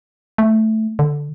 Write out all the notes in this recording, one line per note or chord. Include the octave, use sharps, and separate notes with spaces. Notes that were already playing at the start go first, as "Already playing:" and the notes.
A3
D3